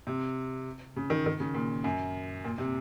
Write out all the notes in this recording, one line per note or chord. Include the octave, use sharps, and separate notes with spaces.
C3
C#3
D#3
D#3
C#3
A#2
F#2
A#2
C3